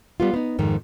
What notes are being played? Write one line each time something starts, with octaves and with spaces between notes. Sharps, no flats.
G3 B3 F4
B3 D#4
F2 G#2 D#3